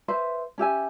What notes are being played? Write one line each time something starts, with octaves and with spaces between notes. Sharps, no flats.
B4 C5 E5
C#4 G4 E5 G#5